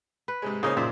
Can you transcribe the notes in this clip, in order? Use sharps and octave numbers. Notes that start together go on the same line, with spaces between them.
B4
G#2 C3 G#3
A#2 C#3 A#3 C#4 D#4 C5
F#2 A#2 C5 E5